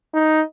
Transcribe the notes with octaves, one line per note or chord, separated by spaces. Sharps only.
D#4